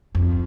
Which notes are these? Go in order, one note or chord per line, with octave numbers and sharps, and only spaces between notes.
F2